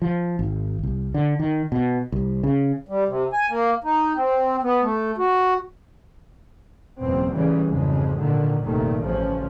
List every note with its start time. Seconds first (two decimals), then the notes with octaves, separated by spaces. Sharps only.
0.02 F3
0.39 G#1
0.83 C2
1.14 D3
1.40 D#3
1.72 B2
2.12 C2
2.43 C#3
2.89 G3
3.08 C3
3.33 G#5
3.49 A#3
3.84 D#4
4.16 C4
4.63 B3
4.82 A3
5.18 F#4
7.00 F#1 E2 B2 C4
7.33 A2 C#3 E3 G3
7.68 G#1 F2 C#3 G#3
8.17 A#2 D3 D#3
8.62 F1 G2 A#2 D#3 A3
9.02 A1 C#3 F3 C#4